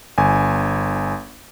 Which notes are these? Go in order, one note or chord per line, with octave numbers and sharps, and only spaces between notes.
G1 G#5